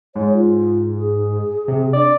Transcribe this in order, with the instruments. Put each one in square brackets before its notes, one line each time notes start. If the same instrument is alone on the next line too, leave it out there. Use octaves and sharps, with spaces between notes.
[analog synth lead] G#2 [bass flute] C#5
[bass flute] F4
G#4
[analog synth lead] C3
[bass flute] D4 [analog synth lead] D5